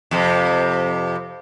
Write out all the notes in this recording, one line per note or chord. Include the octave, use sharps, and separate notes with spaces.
F2 C3